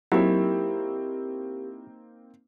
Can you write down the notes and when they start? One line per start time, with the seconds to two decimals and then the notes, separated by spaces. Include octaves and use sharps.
0.12 F#3 A#3 C4 D#4 E4 G4 A#4